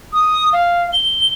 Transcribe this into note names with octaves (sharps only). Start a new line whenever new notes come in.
D#6
F5
G7